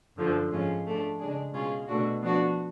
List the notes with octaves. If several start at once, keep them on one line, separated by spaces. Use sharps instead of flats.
F#2 D3 F3
G#2 F3 G#3 C#4 F4
F3 A3 D4
C#3 G#3 D4 G#4
B2 G#3 C#4 F4 G#4
B2 A3 D4 F#4
F3 B3 D4 F#4